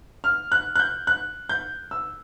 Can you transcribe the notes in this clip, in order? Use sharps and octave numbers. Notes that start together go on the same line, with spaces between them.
F6
F#6
F#6
G6
F#6
G6
E6